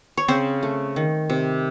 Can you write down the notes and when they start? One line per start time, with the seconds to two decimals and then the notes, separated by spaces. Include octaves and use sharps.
0.17 C#5
0.28 C#3 C4 C5
0.63 A3
0.96 D#3
1.30 C3